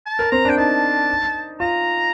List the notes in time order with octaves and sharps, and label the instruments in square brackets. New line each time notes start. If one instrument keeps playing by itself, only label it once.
[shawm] A5
[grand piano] A#4
[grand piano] C4 [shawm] A#5
[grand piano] D4
[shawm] G5
[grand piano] D#4 [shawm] A5
[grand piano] F4 [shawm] A#5